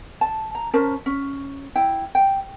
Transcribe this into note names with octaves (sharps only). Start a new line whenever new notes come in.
A5
A#5
C#4 A#4 C5 A5
C#4
E4 G5
G5